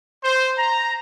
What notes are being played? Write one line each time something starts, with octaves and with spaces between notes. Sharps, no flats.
C5
A#5